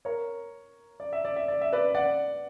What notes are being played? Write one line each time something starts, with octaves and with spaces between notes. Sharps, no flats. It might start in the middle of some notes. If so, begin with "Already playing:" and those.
A#4 C#5
D5
E5
D5
E5
D5
E5
B4 D5
D5 F#5